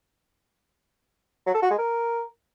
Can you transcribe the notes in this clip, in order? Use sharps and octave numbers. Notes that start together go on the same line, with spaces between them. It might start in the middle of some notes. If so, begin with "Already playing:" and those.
F#3
A4
F#4
G#3
A#4